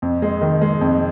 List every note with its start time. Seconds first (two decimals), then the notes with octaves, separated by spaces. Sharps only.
0.02 F2
0.22 G#3
0.41 D#3
0.62 G#3
0.81 F2